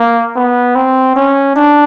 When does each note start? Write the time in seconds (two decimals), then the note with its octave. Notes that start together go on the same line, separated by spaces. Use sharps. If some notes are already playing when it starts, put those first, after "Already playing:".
Already playing: A#3
0.36 B3
0.75 C4
1.16 C#4
1.56 D4